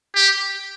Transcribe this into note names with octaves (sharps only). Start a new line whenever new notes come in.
G4